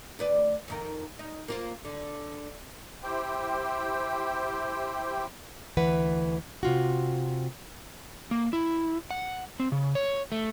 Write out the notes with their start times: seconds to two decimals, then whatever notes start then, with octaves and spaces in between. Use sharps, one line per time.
0.19 D2 B4 D5
0.68 F2 D#3 A#4
1.19 D#4
1.48 A#3 F4 C5
1.85 D3
3.03 E4 G4 C5 G5
5.77 D2 E3 B4 F#5
6.63 C3 F4 F#4
8.31 A#3
8.53 E4
9.11 F#5
9.60 C4
9.72 C#3
9.95 C#5
10.32 A3